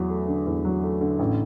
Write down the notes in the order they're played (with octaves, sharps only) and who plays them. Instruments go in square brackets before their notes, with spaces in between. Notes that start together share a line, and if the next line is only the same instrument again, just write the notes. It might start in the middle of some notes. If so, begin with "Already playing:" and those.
Already playing: [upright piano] E2 F#3
A3
D3
E2
F#3
A3
D3
A1